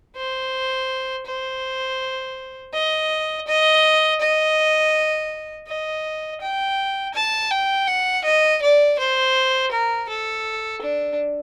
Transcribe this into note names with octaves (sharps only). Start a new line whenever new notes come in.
C5
C5
D#5
D#5
D#5
D#5
G5
A5
G5
F#5
D#5
D5
C5
A#4
A4
D4